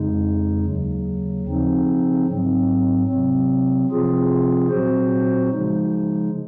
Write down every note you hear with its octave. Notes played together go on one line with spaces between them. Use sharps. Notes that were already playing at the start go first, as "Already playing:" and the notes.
Already playing: F2 C#3 G#3 D#4
D#2 C#3 F#3
C#3 F3 C4 D#4
G#2 F#3 C4
C3 F#3 C4
C3 F3 C4 F4 G#4
A#2 F#3 C4 F#4 C5
C#3 F3 G#3 D#4